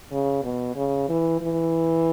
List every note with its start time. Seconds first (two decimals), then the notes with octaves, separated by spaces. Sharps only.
0.11 C#3
0.43 B2
0.75 C#3
1.09 E3
1.41 E3